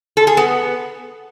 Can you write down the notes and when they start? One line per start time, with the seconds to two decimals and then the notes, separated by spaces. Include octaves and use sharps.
0.17 A4
0.27 G#4
0.37 B3